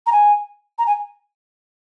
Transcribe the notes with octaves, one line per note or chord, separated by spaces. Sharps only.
A#5
G#5
A#5
G#5